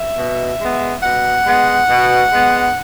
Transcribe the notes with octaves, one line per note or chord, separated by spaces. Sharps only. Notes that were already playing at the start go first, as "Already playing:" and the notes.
Already playing: E5
B2
G#3 B3
B2 F#5
G#3 B3
B2
G#3 B3